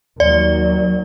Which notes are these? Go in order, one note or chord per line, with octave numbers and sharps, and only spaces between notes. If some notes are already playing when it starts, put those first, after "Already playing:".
D#2 F#3 D5